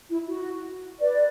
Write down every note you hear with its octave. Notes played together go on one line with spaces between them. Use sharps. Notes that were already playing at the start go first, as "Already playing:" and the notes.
E4
F#4
B4 D5